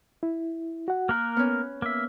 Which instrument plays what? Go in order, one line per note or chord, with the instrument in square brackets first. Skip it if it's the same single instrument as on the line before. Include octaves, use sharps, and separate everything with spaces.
[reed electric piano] E4
F#4 F#5
[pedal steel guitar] A#3 A#4 [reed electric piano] F6 F#6
[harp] B3 C#4
[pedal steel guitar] A#3 E5